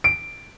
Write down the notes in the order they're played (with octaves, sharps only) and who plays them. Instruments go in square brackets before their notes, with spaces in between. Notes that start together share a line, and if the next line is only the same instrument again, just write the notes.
[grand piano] D7